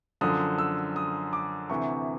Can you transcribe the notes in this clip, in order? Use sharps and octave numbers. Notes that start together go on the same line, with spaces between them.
F#2 D3 F3 D#6
E6
D#6
D6
D2 C3 E3 C#6